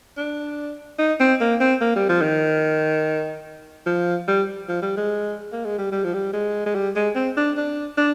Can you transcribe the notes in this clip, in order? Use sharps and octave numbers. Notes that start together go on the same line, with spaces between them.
D4
D#4
C4
A#3
C4
A#3
G3
F3
D#3
F3
G3
F3
G3
G#3
A#3
G#3
G3
G3
F3
G3
G#3
G#3
G3
G#3
C4
D4
D4
D4